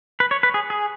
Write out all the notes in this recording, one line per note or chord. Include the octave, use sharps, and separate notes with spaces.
B4
C#5
B4
G#4
G#4